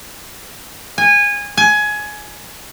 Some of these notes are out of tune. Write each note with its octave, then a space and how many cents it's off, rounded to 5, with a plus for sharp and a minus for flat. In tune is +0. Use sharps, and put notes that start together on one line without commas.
G#5 -20
G#5 +20